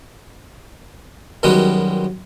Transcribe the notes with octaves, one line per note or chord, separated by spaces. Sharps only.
F#2 B2 D#3 G3 G#3 B3